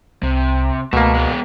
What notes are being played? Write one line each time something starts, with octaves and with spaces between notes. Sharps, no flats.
C2 C3
C#2 B2 A3 A#3
G#3 B3